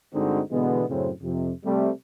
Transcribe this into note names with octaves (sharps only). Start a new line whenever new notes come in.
G2 D3 G#3 C4 D#4 F#4
B2 D3 E3 G#3 B3
F#2 A2 C#3 C4
F2 C3
C3 G3 A3